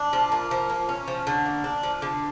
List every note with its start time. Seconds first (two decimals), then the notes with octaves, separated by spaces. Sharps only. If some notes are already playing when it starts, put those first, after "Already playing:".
Already playing: D4
0.13 F3
0.32 A#3
0.51 F3
0.70 A#3
0.89 C#4
1.08 F3
1.27 D3
1.45 A#3
1.64 D4
1.83 F3
2.02 D3